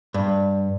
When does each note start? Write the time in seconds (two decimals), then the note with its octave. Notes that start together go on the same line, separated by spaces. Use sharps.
0.14 G2